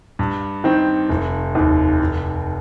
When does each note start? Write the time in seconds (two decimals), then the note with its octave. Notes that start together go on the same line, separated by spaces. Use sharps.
0.19 G2
0.64 D#3 C4
1.09 F1
1.55 D#2 D#3
2.00 F1